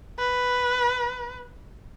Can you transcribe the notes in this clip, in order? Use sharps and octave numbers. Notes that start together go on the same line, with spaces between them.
B4